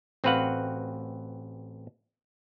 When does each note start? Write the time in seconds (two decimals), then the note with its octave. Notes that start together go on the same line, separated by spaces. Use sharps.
0.24 A1 C4 F#4 B4 F5 F#5